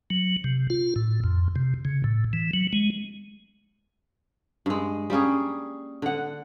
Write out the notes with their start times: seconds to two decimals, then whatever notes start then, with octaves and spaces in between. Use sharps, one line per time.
0.10 F#3
0.44 C3
0.70 F4
0.96 A2
1.24 F2
1.56 C3
1.85 C#3
2.04 A2
2.33 E3
2.54 F#3
2.73 G#3
4.66 G2 G#3
5.10 G3 A#3 C#4 G#4
6.02 D3 F#5